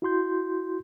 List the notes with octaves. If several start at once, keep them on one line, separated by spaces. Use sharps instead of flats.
E4 F#4 C6 G6